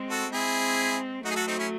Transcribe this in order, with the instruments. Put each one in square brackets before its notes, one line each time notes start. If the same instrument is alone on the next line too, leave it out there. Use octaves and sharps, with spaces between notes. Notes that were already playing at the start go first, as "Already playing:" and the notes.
Already playing: [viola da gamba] G#3 C4
[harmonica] F#4 A4
[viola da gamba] G#3 C4 [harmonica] E4 G#4
[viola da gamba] F#3 A3 [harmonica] D#4 F#4
[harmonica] G#4
F#4 A4
C4 D#4
C#4 E4